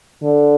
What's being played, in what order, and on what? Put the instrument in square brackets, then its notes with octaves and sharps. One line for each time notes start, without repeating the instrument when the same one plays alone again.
[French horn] D3